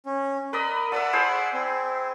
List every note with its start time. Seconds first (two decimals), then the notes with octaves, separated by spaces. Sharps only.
0.06 C#4
0.53 A#4 B4 D5 D#5
0.92 A4 B4 D5 E5 F#5
1.13 E4 G#4 C5
1.54 C4